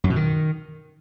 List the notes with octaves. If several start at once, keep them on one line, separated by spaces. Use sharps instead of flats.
F#2
B2
D#3